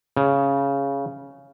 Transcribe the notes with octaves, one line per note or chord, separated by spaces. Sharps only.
C#3